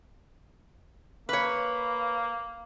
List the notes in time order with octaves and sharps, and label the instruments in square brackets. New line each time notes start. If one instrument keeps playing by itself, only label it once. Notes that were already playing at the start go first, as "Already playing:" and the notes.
[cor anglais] A#3 [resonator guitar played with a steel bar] B4 C#5